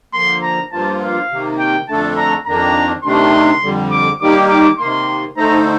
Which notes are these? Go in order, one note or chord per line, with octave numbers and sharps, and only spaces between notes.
D3 F3 A#3 C6
A#5
G2 F3 A#3 F4 A5
F5
C3 D#3 A#3
G5
F2 D3 A3 D4 A4 A5
A#5
F2 D#3 A#3 D4 A#5
C3 D#3 A3 D4 C6
F2 D3 G3
D6
D#3 G3 A#3 D#4 G4 D6
D6
C3 D#3 A#3 C6
D3 A3 D#4 A4 C5 A#5